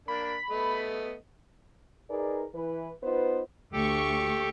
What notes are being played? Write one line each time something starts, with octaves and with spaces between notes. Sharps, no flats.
A#3 D4 A#4 B5
A3 B3 D#5
D#4 G#4 A#4 B4 D5
E3 B4
B3 D#4 F4 B4 C5
D2 G4 A4 G5 C#6